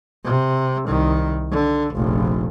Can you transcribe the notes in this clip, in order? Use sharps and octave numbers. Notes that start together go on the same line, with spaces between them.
C3
C2 D#3
D3
F1 A#1